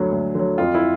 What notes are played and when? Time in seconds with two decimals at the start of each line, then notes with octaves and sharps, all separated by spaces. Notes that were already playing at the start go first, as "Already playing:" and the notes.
Already playing: D2 D3 F#3
0.12 D2
0.35 D3 F#3
0.58 F2 F4
0.75 E4